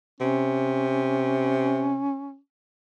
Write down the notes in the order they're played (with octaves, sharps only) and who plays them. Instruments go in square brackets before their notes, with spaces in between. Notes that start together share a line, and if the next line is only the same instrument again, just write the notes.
[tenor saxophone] C3 [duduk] C#4